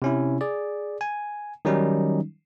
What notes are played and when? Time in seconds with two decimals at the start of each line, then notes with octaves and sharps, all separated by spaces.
0.02 C3 C#4 E4
0.41 G#4 D5
1.01 G#5
1.65 D#3 F#3 G3 C#4 D#4